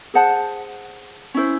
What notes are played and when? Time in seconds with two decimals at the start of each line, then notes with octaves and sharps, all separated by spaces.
0.14 G#4 C5 F#5 A5
1.34 C#4 E4 C5